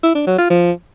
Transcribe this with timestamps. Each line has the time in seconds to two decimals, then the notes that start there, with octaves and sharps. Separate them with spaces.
0.03 E4
0.15 D4
0.27 F#3
0.38 F4
0.50 F3